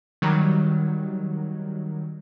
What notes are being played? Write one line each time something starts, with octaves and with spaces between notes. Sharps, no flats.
D#3 F#3 G3